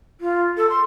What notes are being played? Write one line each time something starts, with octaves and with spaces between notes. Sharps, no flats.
F4
A4
C6